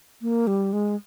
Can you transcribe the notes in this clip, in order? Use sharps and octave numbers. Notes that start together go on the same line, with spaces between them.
A#3
G3
G#3